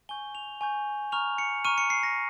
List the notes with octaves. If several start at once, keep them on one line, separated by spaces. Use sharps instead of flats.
G#5 C#6 G6 G7
F7
G#5 C#6 G6
A#5 C#6 F6 F7
C#7
A#5 C#6 F6 D#7
C#7
C7
A#6